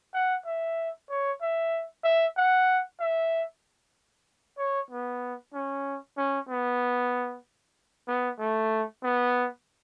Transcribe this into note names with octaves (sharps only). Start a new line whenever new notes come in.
F#5
E5
C#5
E5
E5
F#5
E5
C#5
B3
C#4
C#4
B3
B3
A3
B3